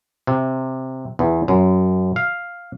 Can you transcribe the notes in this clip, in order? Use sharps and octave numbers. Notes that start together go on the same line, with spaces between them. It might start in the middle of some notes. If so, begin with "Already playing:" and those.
C3
E2
F#2
F5